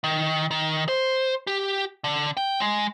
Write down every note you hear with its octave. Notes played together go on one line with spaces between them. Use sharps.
D#3
D#3
C5
G4
D3
G5
G#3